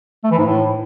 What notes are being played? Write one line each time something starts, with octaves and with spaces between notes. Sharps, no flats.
A3
E3
G#2
A2